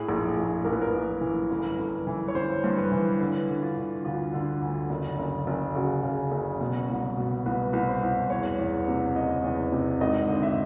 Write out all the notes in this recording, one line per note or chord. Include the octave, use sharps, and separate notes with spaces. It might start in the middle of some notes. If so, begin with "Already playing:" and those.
Already playing: A2 G#4
A#1
A#1
A#1 A#4
B4
A#4
A#1
E3
G1
G1
E3
C#5
G1 C5
G2
B4
E3
D3 B4
D3
F4
D3
D2 F4
D3
D2
F#1
F#1
F#1
C#3 F#4
C#3
F#1
B2
C2
B2
C2 B4
C2
C5
C2
E2 C#5
E2
C3
F#1 D#5
E2
C3
G#1 D#5
D3
E5